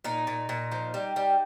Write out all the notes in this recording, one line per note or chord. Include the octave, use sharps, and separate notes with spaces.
A#2 D#4
A#2
A#2
F3
G3
G3